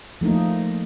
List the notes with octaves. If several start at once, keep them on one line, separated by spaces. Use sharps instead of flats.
F3 A3 A#3 D#4